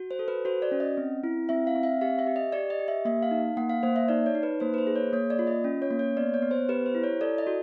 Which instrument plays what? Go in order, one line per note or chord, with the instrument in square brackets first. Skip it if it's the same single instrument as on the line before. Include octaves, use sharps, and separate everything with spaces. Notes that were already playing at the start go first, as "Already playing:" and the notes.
Already playing: [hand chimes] F#4
C5
A4
B4
F#4 C5
D5
C#4
D#5
C4
E4
C4 E5
F5
C4
E5
G4 F5
E5
G4
D#5
G4 D5
D#5
G4
E5
A#3 E5
F5
D#4
A#3 F#5
F5
A#3 C5
E5
D#4 D5
C#5
D#4
B4
A#3 C5
B4
C5
G#4
C#5
A#3 C#5
D5
F4
D#5
C#4
C#5
A#3
C#5
B3 D5
C#5
B3
C5
G4 B4
C5
E4
C#5
A4 D5
D#5
F#4